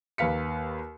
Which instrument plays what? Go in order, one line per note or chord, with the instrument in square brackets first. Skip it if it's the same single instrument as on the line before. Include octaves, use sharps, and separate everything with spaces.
[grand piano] D#2 A#3 B4 F5 B6 C#7